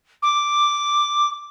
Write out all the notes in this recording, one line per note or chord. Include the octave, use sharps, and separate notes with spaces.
D6